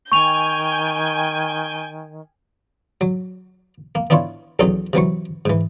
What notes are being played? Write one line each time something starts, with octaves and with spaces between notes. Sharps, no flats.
D#3 G5 G#5 C#6 G6 F7
F#3
A#3
B3 D4 E4 F4 C#5
B1 E2 D#3 F#3 C#4 D#4
C3 E3 F#3 C#6
G#2 E3